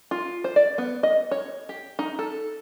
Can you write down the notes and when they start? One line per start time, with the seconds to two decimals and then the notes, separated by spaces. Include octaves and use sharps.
0.11 F4
0.44 C5
0.56 D5
0.78 B3
1.03 D#5
1.31 C#5
1.69 G4
1.99 D#4
2.19 A4